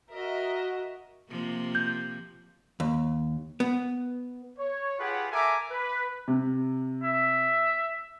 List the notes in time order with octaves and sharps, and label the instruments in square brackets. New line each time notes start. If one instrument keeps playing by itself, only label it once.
[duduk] F#4 [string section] A#4 D#5 E5
[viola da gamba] C3 F3 A#3
[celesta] G6
[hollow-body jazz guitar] D#2
B3
[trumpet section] C#5
F4 G4 G#4 B4 F#5
A4 A#4 E5 G#5 A#5 D6
B4
[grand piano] C3
[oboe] E5